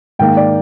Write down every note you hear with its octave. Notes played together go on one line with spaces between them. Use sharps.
G#2 D#3 A#3 G5
D5